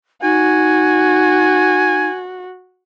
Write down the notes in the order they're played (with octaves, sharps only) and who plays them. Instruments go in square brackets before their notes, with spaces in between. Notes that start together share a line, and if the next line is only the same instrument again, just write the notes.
[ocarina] D#4 [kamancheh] F#4 [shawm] G#5